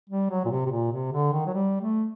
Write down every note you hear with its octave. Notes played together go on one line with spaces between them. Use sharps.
G3
F#3
A#2
C3
C3
A#2
C3
D3
D#3
F#3
G3
A3